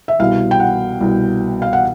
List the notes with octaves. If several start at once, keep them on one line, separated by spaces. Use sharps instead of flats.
E5
C2 B2 F5
G5
F#5
C2 B2
F5
F#5